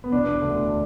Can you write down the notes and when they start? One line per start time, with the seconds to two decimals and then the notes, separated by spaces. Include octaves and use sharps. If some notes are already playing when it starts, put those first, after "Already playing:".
0.04 B3
0.12 E1 D4
0.42 D2